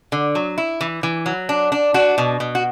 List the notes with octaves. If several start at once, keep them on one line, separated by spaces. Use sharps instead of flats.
D3
F#3
E4
E3
E3
F#3
D4
D4
D4 F#4
B2
B2
F#4